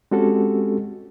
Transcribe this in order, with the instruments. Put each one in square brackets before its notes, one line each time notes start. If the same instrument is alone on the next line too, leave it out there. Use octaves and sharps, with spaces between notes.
[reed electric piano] G#3 C4 C#4 F#4 G4 A4